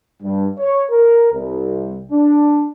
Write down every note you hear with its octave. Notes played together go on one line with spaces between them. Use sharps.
G2
C#5
A#4
C2
D4